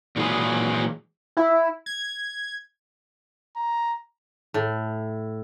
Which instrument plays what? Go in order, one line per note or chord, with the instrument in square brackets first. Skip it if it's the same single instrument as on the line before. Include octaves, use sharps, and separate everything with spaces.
[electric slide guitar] A#2 E3 F#3 G#3 G#4 B4
[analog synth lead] E4
G#6
[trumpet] A#5
[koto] A2